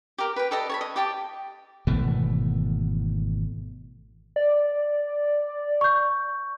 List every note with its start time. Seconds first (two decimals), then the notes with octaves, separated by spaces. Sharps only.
0.18 G4 A#4
0.36 B4 G5
0.51 G4 A4 D5 D#5
0.69 C#5 A5 B5
0.81 D#5
0.96 G4 G5 A5 D6
1.87 G#1 B2 E3 A3
4.36 D5
5.81 C#6 G6